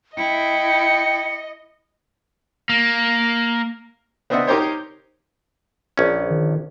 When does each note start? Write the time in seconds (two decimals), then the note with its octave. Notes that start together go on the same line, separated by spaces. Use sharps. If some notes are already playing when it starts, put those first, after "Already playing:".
0.17 E4 D#5 G5 C#7
2.69 A#3
4.30 B3 C4 D4 D#5 E5 F#5
4.47 D#4 G4 A#4 C5 C#5
5.97 A#1 C#4
6.30 D#3